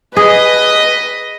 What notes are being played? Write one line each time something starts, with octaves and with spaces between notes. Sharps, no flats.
G#4 B4 D#5